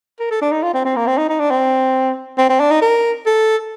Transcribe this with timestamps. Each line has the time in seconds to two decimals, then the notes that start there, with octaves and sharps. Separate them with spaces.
0.20 A#4
0.31 A4
0.41 D4
0.52 D#4
0.63 F4
0.74 C4
0.85 C4
0.96 A#3
1.07 C4
1.18 D#4
1.29 D#4
1.39 D4
1.51 C4
2.38 C4
2.49 C4
2.60 D4
2.71 D#4
2.82 A#4
3.26 A4